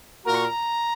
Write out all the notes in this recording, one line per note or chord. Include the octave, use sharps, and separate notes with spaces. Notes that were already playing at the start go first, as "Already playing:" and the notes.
A#2 A#3 F#4 A#4 A#5
C#6
A#5